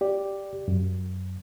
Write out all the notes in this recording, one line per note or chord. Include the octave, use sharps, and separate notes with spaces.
G4 D5
F#2